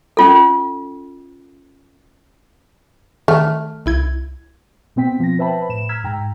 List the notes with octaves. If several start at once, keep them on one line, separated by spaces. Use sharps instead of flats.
C#4 F4 A4
D#3 A3 F6
C2 E4 G#6
B2 B3 C4 G5 B6
F3 A#6
B4 C5 E5 G5 A5 B5
A2 E7
A#5 E6 F6 G#6 B6
G#2 G5 A#5